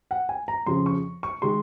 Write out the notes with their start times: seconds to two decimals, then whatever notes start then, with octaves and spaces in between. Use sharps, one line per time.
0.11 F#5
0.29 G#5
0.48 A#5
0.66 F2 C#3 F3 C6
0.86 C#6
1.23 C#6
1.42 D#3 G#3 C6